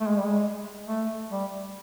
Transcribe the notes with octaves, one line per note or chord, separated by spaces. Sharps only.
A3
G#3
G3
G#3
A3
G3